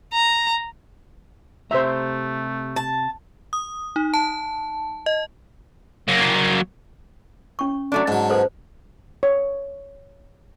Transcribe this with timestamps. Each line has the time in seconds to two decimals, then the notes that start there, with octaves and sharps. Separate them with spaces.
0.13 A#5
1.71 C3 A3 G4 C5 E5 A#5
2.76 A5
3.53 D#6
3.96 D#4
4.14 A5
5.06 D#5
6.08 F#3 A#3
7.59 C#4 C#6
7.92 F#3 A3 D4
8.08 G#2 F#3 A5
8.30 A4 B4 C5
9.23 C#5